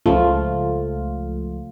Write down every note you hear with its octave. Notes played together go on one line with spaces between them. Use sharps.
C#2 F3 A3 F4